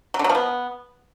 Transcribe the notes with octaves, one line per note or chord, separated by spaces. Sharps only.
F#3
D3
F#3
F3
B3